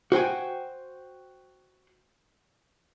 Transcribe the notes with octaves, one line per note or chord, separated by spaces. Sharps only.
F#4 C5 G5 G#5